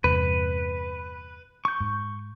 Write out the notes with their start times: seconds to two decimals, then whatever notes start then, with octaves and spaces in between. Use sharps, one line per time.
0.04 E2 G2 C3 B4
1.65 C#6 G6
1.80 G#2